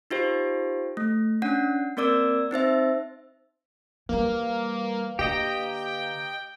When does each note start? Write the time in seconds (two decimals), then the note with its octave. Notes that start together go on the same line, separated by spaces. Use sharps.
0.11 D#4 F4 G4 C5
0.97 A3
1.42 C#4 D4 F#5
1.97 A#3 C4 A#4 D5 D6 E6
2.51 C4 D#4 C5 E5
4.09 E3 G3 A#3 B4 F5 A#5
5.19 D3 A#3 G4 D#5 G5